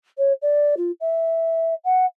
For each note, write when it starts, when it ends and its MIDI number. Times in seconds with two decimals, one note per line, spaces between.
0.18 0.33 73
0.42 0.75 74
0.77 0.91 65
1.00 1.74 76
1.84 2.05 78